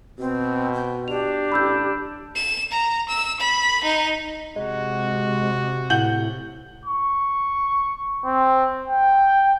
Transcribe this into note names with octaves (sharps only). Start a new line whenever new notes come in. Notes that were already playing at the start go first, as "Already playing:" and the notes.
B2 C4
G5
D4 G4 F7
A1 B5 E6 G6
E7
A#5
E6
B5
D#4
C3 G#3 F#4
A2 F#5 G6 F#7
C#6
C4
G5